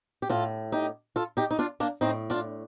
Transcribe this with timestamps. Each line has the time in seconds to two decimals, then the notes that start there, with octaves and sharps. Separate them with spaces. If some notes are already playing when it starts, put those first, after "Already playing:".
0.22 G4
0.30 A2 F4 A4
0.72 D#4 G4
1.16 F4 A4
1.37 D#4 G4
1.51 D#4
1.59 D4 F4
1.80 A#3 D4
2.01 A2 C4 D#4
2.30 D4 F4